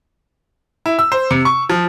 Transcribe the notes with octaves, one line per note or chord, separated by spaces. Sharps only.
E4
E6
C5
C3
C#6
F3